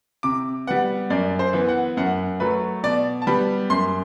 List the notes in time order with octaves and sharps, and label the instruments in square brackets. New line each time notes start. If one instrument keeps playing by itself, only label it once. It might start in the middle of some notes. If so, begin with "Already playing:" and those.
[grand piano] C3 D6
G3 B3 F#5
F#2 D5
C5
E3 B3
F#5
F#2 F#5
F#3 A3 B4
B2 D5
A5
G3 B3 B5
F#2 C6